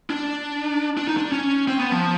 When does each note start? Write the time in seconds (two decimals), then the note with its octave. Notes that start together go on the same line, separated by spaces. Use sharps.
0.10 D4
0.97 D4
1.08 D#4
1.17 D4
1.32 C#4
1.68 C4
1.79 B3
1.92 F3